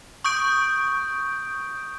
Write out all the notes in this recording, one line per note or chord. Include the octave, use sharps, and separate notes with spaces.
C#6 D#6 G6 D7